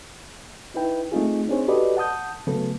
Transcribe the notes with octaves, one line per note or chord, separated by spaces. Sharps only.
D#4 E4 B4 G5
A3 C4 D#4 F4 G#4
C4 D4 D#4 G#4 C5 C#5
F#4 G4 A4 B4 D5 D#5
F#5 A5 D#6 G6
C#3 F#3 A3 B3 A4